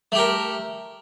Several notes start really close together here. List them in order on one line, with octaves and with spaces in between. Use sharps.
A3 G4 A#4